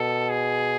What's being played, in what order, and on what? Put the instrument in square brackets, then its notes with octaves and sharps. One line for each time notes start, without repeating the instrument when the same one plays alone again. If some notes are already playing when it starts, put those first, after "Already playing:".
Already playing: [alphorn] B2 [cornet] A4
[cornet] G#4